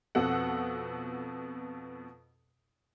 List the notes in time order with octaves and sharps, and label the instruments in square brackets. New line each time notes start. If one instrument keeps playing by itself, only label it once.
[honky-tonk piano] F2 B2 A4 F#5